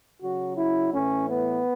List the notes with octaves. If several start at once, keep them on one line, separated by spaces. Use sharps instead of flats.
C#3 F#3 F#4
E4
A2 E3 C#4
B3